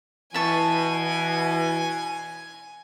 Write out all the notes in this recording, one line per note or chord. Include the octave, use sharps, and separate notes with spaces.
B2 E3 E5 G#5 A5 C#6